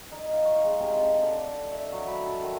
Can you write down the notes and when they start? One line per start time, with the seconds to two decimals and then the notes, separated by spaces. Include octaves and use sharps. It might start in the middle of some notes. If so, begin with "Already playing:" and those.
0.11 D#4
0.33 F5
0.45 C#6
0.63 G#3
0.80 C3
0.99 A5
1.22 D3
1.72 E5
1.92 F#3
2.07 B5
2.26 A4
2.42 D#3